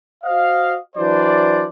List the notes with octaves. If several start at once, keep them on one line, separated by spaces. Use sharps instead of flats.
F#4 C5 D#5 F5
E3 F#3 D4 C5 D5